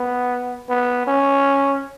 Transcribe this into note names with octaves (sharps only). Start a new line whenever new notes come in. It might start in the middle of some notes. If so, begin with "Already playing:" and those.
Already playing: B3
B3
C#4